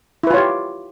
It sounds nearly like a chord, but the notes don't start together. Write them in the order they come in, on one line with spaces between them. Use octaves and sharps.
E4 B4 F4 C#5 G4